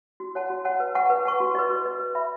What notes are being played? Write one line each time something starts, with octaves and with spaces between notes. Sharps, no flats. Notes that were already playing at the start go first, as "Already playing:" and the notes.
F#4
C#5 F#5 A5
F#4
C#5 F#5 A5
B4
F#5 A5 C#6
B4
F#5 A5 C#6
F#4
B4 D#5
F#4
B4 D#5
B4
E5 B5